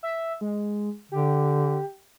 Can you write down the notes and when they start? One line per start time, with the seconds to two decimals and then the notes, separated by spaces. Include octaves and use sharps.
0.03 E5
0.41 G#3
1.12 D3 G4